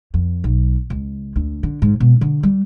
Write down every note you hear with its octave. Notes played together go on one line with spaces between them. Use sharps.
F2
B1
C#2
D2
D3
G#2
B2
D3
G3